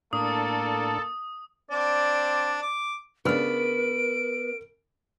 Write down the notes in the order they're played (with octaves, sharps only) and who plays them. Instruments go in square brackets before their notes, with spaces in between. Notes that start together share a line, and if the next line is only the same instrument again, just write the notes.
[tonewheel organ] A2 D4 [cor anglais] A#3 [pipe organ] A4 [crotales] D#6
[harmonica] C4 D4 [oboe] D5
[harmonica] D6
[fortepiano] C#3 D4 F6 [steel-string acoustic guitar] B3 B4 [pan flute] A#4 [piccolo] D7